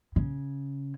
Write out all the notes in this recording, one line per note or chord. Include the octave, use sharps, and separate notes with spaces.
C#3